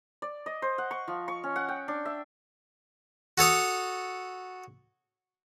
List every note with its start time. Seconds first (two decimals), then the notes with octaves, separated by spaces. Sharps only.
0.22 D5
0.46 D#5
0.62 C5
0.78 F#5
0.91 C#6
1.08 F3
1.28 C#6
1.44 C#4
1.56 F#5
1.69 G5
1.88 D4
2.05 E5
3.38 F#4 A4 C#5 D#6